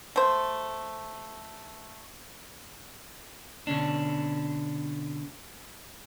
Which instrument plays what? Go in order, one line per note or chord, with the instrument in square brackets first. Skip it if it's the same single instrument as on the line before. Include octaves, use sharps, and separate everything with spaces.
[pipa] A3 C5
[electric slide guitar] B2 D3 C#4 D4